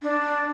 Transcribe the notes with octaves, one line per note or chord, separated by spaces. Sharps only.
D4